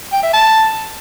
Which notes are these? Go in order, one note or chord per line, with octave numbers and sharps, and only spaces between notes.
G5
E5
A5